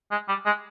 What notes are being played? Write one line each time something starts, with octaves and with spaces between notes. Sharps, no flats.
G#3
G3
G#3